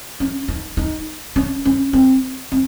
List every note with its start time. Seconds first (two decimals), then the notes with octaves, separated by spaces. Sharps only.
0.20 C#4
0.48 D#4
0.77 D#4
1.36 C#4
1.65 C#4
1.93 C4
2.52 C4